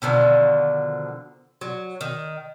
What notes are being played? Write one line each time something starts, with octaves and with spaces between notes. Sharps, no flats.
B2 D3 D#3 F3
F#3
D#3